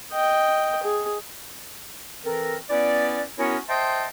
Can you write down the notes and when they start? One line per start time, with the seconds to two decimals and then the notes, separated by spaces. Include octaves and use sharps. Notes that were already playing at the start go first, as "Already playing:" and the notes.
0.12 D#5 G5
0.83 G#4
2.25 E3 C4 A4 A#4
2.70 B3 C#4 E4 B4 D5
3.38 B3 C#4 E4 F#4 A#4 C#5
3.68 C5 D#5 E5 G5 A5 C6